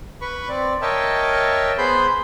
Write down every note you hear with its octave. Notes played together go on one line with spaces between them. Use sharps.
B4 B5 C#6
C4 D5
A#4 C#5 D#5 E5 G5 A5
B3 G#4 C5 B5 C6 G6